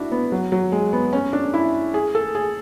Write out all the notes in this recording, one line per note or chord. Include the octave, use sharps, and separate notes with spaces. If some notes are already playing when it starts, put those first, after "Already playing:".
Already playing: D4 E4 F#4
B3
F#3
F#3
G#3
B3
C#4
D4
E4
G#4
A4
G#4